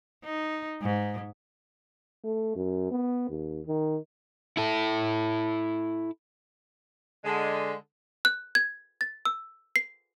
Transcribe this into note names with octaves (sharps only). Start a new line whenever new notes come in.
D#4
G#2
A3
F#2
B3
D#2
D#3
E4 A4
D3 G#3
F#6
G#6
A6
E6
C7